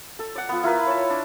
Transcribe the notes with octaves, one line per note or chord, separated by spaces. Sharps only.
A4
D5 F#5
F3 B3
E4 F4 A#4 B4
C#5 A5
D4